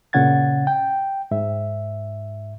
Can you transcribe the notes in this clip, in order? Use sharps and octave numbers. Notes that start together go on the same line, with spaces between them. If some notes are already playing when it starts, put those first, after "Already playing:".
A#2 C#3 C#4 F#5 G#6 A6
G5
G#2 E5